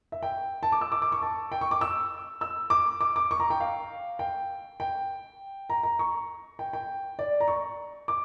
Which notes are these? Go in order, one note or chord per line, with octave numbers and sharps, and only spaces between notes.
E5
G5
A5
D6
E6
D6
D6
C#6
A5
G5
C#6
D6
E6
E6
D6
D6
D6
C#6
A#5
G5
F5
G5
G5
A#5
A#5
C#6
G5
G5
D5
A#5
C#6
D6